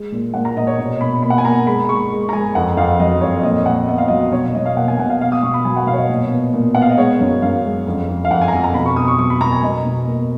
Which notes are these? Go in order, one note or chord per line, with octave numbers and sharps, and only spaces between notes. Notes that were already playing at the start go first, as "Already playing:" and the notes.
Already playing: G#3
A#2
A#2 F#5
A#5
A#2 D#5
C#5
B2 D#5
B2 B5
A#3 B5
F#5
G#5
A#3 A#5
G#3 B5
G#3 C#6
G#3
A#5
G#3 G#5
F2 F#5
F2 F5
F#3 D#5
F2 C#5
A#2 D#5
A#2 F#5
B3 D#5
F5
F#3 D#5
B2 C#5
B2 D#5
F5
A#3 F#5
G#5
B2 F#5
F5
B3 F5
D#6
B2 C#6
B5
F#3 G#5
F#5
B2 F5
C#5
D#5
A#2
B3
A#2
B3 F#5
F5
D#5
G#3 C#5
F#2
F#2 F5
G#3
F2
F2
F5
F2 F#5
G#5
A#5
F2 G#5
A#5
B2 B5
C#6
B2 D#6
C#6
F#3 C#6
B5
B2 A#5
G#5
B2 D#5
B2
A#3